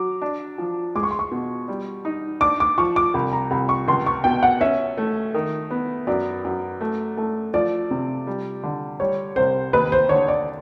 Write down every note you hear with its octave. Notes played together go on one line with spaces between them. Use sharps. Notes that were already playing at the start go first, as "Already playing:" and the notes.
Already playing: F#3 D6
D4
F3
G#3 D6
C#6
C6
C#6
B2
G3
D#4
D4 D6
D6
F3 C#6
D6
C2 B5
A#5
C2 B5
C#6
C#2 C6
C#6
B2 G5
F#5
C#4 E5
A3
D#3
B3
F#2 D5
F#2
A3
A3
F3 D5
C3
G3
D3
G3 C#5
C2 C5
D#2 B4
C5
D3 C#5
D5